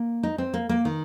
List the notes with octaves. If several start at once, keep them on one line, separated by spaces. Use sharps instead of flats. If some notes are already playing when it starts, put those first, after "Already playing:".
Already playing: A#3
D#4
C4
A#3
A#3
D#3